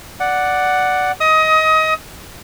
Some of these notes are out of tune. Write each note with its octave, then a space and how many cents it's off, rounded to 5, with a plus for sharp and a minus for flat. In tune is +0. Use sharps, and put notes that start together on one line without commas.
D5 +0 F#5 +0
D#5 +20 D#6 +25